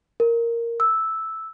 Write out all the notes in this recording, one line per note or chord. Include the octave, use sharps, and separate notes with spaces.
A#4
E6